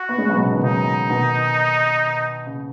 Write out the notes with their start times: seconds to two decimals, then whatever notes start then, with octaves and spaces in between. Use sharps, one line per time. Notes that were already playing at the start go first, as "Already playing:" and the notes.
Already playing: F#4
0.09 B3
0.18 G#3 C#4
0.30 F#3 B3
0.37 B2
0.41 C#3
0.52 B2 D#3
0.64 C#3 F#3 D#4
1.09 B2 D#3
2.46 C#3